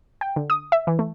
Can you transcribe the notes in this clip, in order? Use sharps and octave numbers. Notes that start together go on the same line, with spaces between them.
G5
D3
D#6
E5
E3
A3